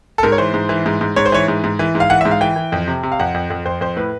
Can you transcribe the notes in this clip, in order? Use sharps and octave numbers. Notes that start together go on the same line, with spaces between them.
A4
G#2 A#4
C#5
E3 C5
G#2
E3
G#2
G#2
G#2 C#5
C5
E3 C#5
G#2
G#2
E3
G#2
F5
E3 F#5
E5
G#2
F5
E3 G5
E3
F2
C3
C3
F5
F2 F#5
F2
F2
F2 C5
F2 C5
A2 B4